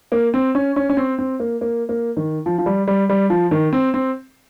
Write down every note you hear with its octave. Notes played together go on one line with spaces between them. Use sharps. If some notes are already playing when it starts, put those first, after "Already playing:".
A#3
C4
C#4
C#4
C#4
C4
C4
A#3
A#3
A#3
D#3
F3
F3
G3
G3
G3
F3
D#3
C4
C4